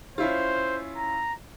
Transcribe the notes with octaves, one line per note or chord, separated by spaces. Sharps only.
C#4 E4 F4 C5
A#5